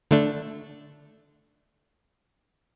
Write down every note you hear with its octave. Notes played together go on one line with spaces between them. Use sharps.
D3 A3 D4